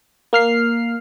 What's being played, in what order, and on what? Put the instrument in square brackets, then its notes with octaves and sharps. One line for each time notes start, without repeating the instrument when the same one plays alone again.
[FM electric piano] A#3 F6 C7